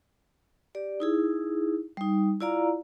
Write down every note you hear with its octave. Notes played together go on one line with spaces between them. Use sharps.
G4 D5
D#4 E4 G#4
G3 D#4
E4 F4 D5 F5 A#5